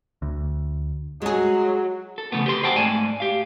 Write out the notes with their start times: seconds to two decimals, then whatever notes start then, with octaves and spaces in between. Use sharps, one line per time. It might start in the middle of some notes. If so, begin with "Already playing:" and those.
0.22 D2
1.22 F#3 G#3 G#4
2.18 A4
2.32 C#3 F3 A3 B3
2.46 G4 B4 C6
2.63 G#4 C5 F#5 G5 A5
2.76 G#2 A3 D5 G#5 A5
3.20 G4 F5